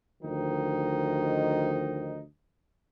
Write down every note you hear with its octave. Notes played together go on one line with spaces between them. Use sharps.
D2 D#3 F3 D#4